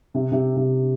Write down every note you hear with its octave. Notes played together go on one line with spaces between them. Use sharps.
C3
C3
C3